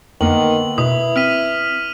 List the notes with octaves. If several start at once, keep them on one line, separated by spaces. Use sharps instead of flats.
F2 D3 D#3 A#3 B3 F#7
B2 E4 B4 D#6
C4 F6 B6 D#7